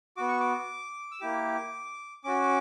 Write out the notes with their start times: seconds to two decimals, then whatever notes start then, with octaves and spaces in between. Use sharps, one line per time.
0.16 B3 F#4 D6
0.28 C#6
0.40 D6
1.11 E6
1.20 A#3 E4 G4 D6
2.24 C#4 F#4 D6